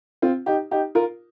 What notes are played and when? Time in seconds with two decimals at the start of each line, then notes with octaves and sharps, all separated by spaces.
0.22 C4 F4
0.46 D#4 G4
0.71 D#4 G4
0.95 F4 A#4